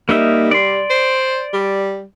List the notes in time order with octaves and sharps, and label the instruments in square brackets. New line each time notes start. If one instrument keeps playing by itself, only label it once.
[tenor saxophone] G3 [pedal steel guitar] A#3 D#4 E5
[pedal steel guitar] D5 C6
[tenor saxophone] C5
G3